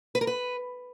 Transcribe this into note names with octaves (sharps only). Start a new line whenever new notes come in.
B4
A#4
B4